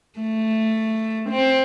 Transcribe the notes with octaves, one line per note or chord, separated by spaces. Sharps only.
A3
C4